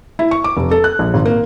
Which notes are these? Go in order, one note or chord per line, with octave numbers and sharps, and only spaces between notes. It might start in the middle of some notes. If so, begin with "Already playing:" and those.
E4
C#6
D6
F1
A4
F#6
A#1
G#1
A#3